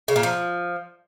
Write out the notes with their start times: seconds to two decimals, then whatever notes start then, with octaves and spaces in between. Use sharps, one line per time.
0.08 C#3
0.16 A#2
0.23 F3